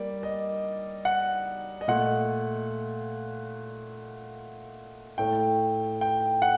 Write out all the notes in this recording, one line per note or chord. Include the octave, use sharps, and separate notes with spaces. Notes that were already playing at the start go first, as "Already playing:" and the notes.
Already playing: G3 A#3 D5
D#5
F#5
D#5
A#2 A3 F#5
A2 A3 G5
G5
F#5